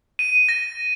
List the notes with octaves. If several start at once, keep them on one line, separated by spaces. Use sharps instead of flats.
D#7
A#6